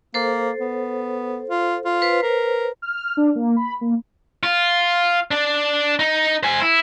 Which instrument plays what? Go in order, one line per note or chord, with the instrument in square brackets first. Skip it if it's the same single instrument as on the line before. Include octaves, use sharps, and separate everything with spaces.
[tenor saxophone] A#3 [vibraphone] A4 C5
[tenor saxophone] B3
F4
F4
[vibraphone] B4 C5
[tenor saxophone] A#4
[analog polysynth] F6
D4
A#3
B5
A#3
[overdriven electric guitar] F4
D4 D5
D#4
C5 G#5
E4